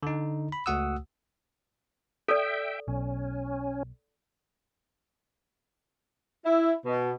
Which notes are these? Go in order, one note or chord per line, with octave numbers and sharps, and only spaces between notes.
D3 D#4
B5
C#2 A3 F#4 F#5 D#6 E6
A4 D5 E5 G5
B1 C#4
E4
B2